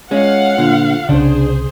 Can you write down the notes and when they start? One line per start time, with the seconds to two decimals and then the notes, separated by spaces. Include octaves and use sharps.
0.11 G#3 C#4 F4 F5 F#5
0.58 D2 A#2 D3
1.09 C2 C#3 D4 G#4 C5